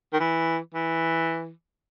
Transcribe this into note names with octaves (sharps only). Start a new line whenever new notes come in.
D#3
E3
E3